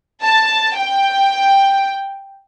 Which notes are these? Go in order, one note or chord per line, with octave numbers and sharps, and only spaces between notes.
A5
G5